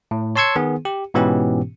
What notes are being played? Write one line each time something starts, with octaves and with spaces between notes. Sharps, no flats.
A2
C#5 A5 C6 E6 G#6 C#7
D#3 B3 G#4
G4
G#2 B2 E3 B3 C#4 G4